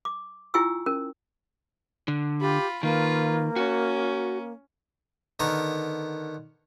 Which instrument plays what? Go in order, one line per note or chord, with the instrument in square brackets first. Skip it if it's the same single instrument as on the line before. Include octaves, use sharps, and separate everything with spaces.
[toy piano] D6
E4 F4 G5 G#5 C#6 E6
C#4 A#4
[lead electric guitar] D3
[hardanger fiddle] F4 B5 [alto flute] G4
[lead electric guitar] D#3 [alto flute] A#3 [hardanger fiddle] F4 B4
[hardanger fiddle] C#4 [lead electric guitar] F#4
[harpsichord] D3 D#3 B3 A#4